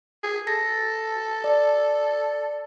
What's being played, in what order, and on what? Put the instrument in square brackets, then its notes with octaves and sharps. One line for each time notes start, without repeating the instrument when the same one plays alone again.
[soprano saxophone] G#4
[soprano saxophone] A4 [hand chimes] A#6
[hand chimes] D5